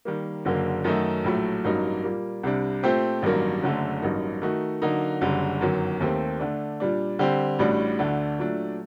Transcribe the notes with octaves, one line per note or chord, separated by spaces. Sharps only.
D#3 G3 A#3
F#1 F#2 D3 F#3 A#3
F#2 D#3 F#3 A3 D#4
A#1 A2 F#3 A3
A1 G2 F#3 A#3 D#4
A#2 G3 A#3
C2 C3 G3 D4
A#2 A3 C4 G4 C5
A1 G2 D#3 F#3 A#3
F#1 F#2 D3 A3
A1 G2 F#3 A#3 D#4
D#3 A3 D#4 F#4
D3 F#3 A#3 D#4
F#1 F#2 D3 G3
G1 F#2 D#3 F#3
D#2 D#3 A3 C4 G4
D3 A3 D4
A#2 G3 D4
D3 G3 C4 G4
A1 A2 G3 D4 F#4
D2 D3 A3 D4
A#2 F#3 A3 D4